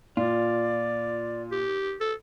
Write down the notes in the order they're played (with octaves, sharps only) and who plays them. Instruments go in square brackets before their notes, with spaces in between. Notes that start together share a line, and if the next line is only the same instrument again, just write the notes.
[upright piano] A#2 [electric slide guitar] F4 [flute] D5
[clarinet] G4
A4